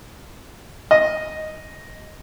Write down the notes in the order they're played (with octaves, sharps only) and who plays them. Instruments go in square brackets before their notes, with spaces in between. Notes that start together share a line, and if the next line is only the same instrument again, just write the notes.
[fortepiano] D#5